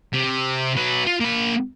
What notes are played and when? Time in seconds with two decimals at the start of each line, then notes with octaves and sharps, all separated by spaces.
0.13 C3
0.77 F#3 B4
1.07 F4
1.21 A#3 B5